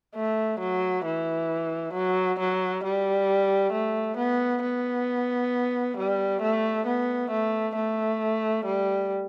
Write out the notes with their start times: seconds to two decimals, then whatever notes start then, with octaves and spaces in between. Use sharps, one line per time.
0.15 A3
0.60 F#3
1.05 E3
1.93 F#3
2.39 F#3
2.84 G3
3.72 A3
4.17 B3
4.63 B3
5.97 G3
6.41 A3
6.87 B3
7.31 A3
7.75 A3
8.65 G3